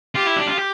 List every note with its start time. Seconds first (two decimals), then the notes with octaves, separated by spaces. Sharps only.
0.15 F4 G4
0.27 E4
0.36 D4
0.47 F4
0.57 G4